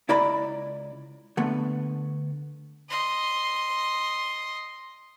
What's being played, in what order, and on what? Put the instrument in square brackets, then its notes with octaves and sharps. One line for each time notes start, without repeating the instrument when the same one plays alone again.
[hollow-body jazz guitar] C#2 E4 D5 A#5 B5
D3 A3 B3
[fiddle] D#5 C6